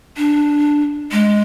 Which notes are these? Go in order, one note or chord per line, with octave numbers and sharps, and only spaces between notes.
D4
G#3